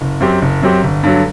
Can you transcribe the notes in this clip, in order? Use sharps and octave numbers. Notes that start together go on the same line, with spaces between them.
F#1
F#2 F#3 C4 G4
F#1
F#2 F#3 C4 G4
G1
G2 D3 F#3